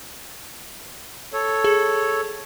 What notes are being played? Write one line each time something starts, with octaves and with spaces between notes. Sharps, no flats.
A4 C#5
G#4